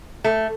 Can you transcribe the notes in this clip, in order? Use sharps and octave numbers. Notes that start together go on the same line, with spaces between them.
A3